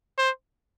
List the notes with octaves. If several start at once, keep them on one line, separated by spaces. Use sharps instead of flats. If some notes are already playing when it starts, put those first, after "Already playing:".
C5